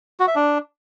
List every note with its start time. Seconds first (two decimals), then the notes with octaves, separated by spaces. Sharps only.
0.20 F#4
0.28 E5
0.36 D4